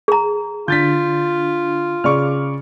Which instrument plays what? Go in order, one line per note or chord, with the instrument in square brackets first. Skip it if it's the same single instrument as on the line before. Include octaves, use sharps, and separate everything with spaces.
[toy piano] G#4 A#5
[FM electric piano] D3 D4 [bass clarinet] F4 [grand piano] G6 A6 B6
[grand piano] C#3 D5 C#6 [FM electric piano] D6 F6